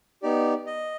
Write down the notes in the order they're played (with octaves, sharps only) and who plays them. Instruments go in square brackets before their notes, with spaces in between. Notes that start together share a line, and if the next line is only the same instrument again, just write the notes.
[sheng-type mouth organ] B3 D#4 G4 D5
D#5